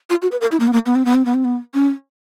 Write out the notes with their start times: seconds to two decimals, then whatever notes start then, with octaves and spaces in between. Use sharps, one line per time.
0.10 F4
0.22 F#4
0.32 B4
0.41 A#4
0.51 E4
0.60 A#3
0.67 B3
0.73 A#3
0.86 B3
0.95 C4
1.05 B3
1.15 C4
1.25 B3
1.34 C4
1.44 B3
1.74 C#4